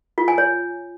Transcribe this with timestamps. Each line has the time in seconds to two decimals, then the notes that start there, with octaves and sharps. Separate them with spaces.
0.18 F4
0.28 G#5
0.38 C#5